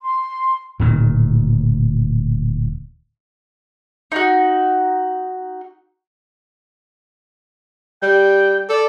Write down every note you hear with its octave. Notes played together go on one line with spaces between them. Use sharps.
C6
D1 A#2 D#3
D#4 F#4
G3 G5
A4 D5